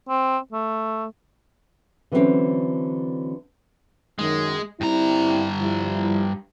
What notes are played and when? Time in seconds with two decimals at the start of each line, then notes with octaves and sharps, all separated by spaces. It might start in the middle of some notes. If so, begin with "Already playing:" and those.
0.09 C4
0.52 A3
2.12 D3 E3 F#3 G3 C4 C#4
4.19 F#2 D#3 G#3
4.81 G2 G3 C4 E4 A#5
5.61 F3 G3 E4